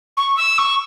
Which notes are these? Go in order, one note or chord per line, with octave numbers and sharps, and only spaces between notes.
C#6
E6
C#6